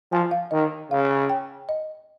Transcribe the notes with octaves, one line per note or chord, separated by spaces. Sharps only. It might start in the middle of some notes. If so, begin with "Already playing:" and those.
F3 G#5
F5
D#3 D#5
C#3 F5
G5
D#5